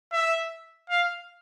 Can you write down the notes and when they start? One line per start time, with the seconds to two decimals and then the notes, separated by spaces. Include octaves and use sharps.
0.13 E5
0.90 F5